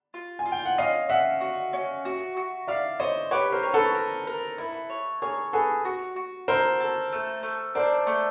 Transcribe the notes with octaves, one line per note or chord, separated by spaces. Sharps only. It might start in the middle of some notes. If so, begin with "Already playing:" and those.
F4
G#5
F4
G5
F#5
C#4 D#5 F5
C#4 E5 F#5
F#4
C#4
F#4
F#4
D5 E5 F5
C5 C#5 D#5
G4 B4 C#5
A#4 C5
C#5
A4 B4
A#4
A#4
E4
C#5
G#4 A#4 C#5
G#4 A4 B4
F#4
F#4
A4 A#4 C5
A4
A3
A3
D4 A#4 C5
A3